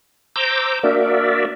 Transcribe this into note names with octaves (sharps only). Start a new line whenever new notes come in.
C5 A#5 D6 E6 G6
A#3 D4 F#4 A#4 D5 E5